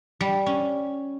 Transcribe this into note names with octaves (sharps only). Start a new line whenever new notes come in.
G3
C#4